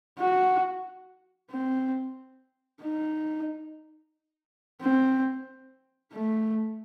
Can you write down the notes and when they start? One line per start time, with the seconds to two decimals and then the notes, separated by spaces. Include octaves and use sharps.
0.19 F#4
1.51 C4
2.83 D#4
4.81 C4
6.13 A3